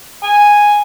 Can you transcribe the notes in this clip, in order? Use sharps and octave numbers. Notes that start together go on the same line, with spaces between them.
G#5